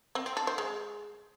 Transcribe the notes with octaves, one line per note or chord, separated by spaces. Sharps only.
C4
C4
A4
C5
G#3